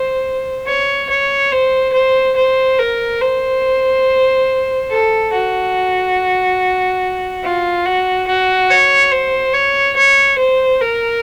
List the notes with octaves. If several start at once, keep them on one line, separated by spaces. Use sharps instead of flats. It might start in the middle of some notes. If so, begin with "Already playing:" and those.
Already playing: C5
C#5
C#5
C5
C5
C5
A#4
C5
A4
F#4
F4
F#4
F#4
C#5
C5
C#5
C#5
C5
A#4